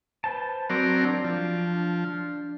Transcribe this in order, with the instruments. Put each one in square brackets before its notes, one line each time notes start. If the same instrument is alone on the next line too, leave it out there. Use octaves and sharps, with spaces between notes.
[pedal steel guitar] B4 C5 A5
[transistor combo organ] F#3 C4 A#4 [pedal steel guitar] D5 D6
[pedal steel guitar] D4 D5
[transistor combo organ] F3